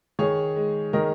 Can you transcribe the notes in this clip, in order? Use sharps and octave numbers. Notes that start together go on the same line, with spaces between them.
D#3 G#4 C#5
G#3
D#3 A#4 D#5